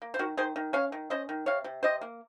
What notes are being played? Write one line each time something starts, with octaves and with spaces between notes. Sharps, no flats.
A#3
C5
D#3 F#4 A#4
D#3 G#4 C5
D#3
C#4 C#5 F5
D#3
C#4 C5 D#5
D#3
C3 C#5 F5
C3
C3 C5 D#5
A#3